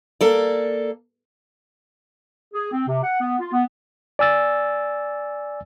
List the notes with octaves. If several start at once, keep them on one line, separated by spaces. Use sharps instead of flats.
A#3 A4 D5
G#4
C4
C3
F#5
B3
F4
B3
D5 G#5 E6 A6